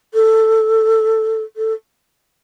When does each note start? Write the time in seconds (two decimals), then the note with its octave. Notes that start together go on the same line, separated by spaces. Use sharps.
0.14 A4
1.56 A4